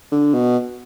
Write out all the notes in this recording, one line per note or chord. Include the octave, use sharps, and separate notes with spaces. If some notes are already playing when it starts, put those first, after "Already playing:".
D3
B2